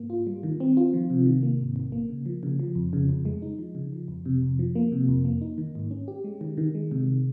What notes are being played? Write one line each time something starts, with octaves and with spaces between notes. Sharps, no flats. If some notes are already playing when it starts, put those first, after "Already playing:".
Already playing: G#2 A#3
F4
G3
D#3
C4
F4
F3
C3
D#3
A#3
G#2
A#1
A#3
C#3
F3
C#3
F3
F2
C#3
F2
G#3
D#4
F3
C#3
F3
F2
C3
F2
F3
A#3
C3
F2
A#3
D#4
D#3
G#2
C#4
G4
G#3
D#3
D#3
G#3
C3